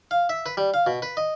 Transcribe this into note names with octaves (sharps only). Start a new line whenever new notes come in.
F5
E5
B4
G3
F5
B2
B4
D#5